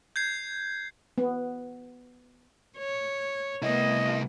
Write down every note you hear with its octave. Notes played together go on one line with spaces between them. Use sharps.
G6 G#6 C7
B3
C#5
C2 A3 B3 E4 D#5